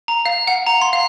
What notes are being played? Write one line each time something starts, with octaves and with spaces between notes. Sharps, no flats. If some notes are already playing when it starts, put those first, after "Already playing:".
A#5
F5
F#5
A#5
C6
F5